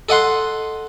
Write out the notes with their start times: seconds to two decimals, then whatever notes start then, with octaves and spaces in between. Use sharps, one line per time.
0.09 A4 D#5 F#5 C6